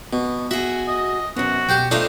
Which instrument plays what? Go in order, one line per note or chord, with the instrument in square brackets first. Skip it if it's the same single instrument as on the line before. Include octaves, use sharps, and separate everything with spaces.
[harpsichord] B2 [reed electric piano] B3
[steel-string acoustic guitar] F#4 G#4 [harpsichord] E5
[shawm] D#5
[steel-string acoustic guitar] F#2 C3 [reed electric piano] B3 C#4 [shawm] F#4
[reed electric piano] B2 [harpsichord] G4 C5 G5
[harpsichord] A3 D4 D#4 [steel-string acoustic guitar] F4 C5 F5